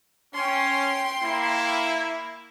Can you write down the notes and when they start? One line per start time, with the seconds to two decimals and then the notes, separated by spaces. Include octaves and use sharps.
0.34 C#4 G5 C6
1.22 A#3 E4